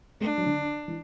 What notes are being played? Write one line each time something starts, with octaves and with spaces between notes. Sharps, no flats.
A3 D4
F#3
D3
E3